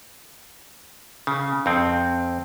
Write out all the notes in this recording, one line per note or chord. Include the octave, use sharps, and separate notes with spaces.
C#3
F2 C4